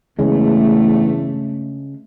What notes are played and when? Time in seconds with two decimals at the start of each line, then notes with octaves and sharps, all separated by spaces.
0.19 E2 G2 C#3 G#3 A3